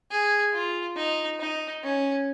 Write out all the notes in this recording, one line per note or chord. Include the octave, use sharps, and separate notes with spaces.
G#4
F4
D#4
D#4
C#4